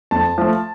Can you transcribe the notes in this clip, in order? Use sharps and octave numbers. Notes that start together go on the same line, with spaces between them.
F2 A5
F3 A3